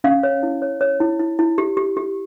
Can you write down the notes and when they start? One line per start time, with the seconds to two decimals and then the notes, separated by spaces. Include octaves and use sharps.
0.04 C#4 F5
0.23 C#5
0.43 E4
0.62 C#5
0.81 C#5
1.00 E4
1.19 E4
1.39 E4
1.58 G4
1.77 G4
1.97 G4